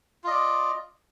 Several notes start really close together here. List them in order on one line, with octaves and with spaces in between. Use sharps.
F4 D#5 D5